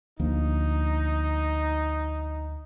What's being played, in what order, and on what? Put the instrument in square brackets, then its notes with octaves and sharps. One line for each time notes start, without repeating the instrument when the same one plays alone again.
[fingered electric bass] D2 F3 A#3 [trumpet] D#4